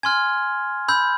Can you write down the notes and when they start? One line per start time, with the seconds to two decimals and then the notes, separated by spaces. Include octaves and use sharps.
0.03 G#5 C6 F6 G#6
0.88 B5 E6 G6